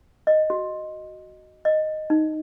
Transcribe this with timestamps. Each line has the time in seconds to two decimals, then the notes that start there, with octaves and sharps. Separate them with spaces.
0.27 D#5
0.50 F#4
1.65 D#5
2.10 D#4